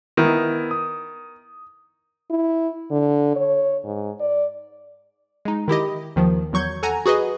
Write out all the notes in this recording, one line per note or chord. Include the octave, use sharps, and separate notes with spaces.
D#3 B3 E4
D#6
E4
D3
C#5
G#2
D5
G#3 D#4
D#3 E4 G4 D#5
D#2 D#3 F3
E2 F#3 C#6 G6 G#6
A4 F#5 G#5 A#5
F#4 G#4 B4 D#5